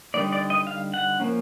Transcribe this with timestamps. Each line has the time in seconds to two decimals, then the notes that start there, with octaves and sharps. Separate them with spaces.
0.14 D3 G3 A#3 D#4 D5
0.32 D5
0.50 D#5
0.67 F5
0.94 F#5
1.20 F3 A#3 C#4